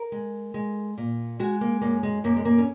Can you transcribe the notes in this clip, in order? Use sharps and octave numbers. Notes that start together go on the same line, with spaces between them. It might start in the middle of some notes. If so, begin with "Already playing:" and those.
Already playing: A#4
G#3
G#3
A#2
G#3 F#4
A#3
F#2 A#3
G#3
F#2 A#3
G#3
A#3
C#4